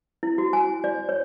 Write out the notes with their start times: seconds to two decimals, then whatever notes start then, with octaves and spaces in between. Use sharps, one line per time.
0.23 E4
0.38 F#4
0.53 G#5
0.84 D5
1.09 C#5